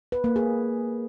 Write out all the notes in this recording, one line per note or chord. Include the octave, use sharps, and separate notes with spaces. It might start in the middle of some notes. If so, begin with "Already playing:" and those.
B4
A#3
G#4